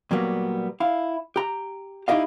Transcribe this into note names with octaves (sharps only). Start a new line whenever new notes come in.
A#2 F#3 G3 A#3 B3
E4 F5
G4 A#5
D#4 E4 G4 D#5 F5